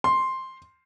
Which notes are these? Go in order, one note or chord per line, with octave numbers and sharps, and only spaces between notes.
C6